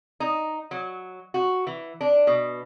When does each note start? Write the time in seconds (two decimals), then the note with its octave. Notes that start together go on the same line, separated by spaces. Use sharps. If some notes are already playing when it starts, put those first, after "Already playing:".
0.20 D#4
0.71 F#3
1.34 F#4
1.67 E3
2.01 D4
2.27 B2